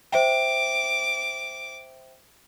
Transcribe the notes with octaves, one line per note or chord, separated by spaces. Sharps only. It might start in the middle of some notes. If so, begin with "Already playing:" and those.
C5 E5 G5 D6